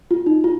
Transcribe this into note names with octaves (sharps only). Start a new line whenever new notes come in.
F4
D#4
F4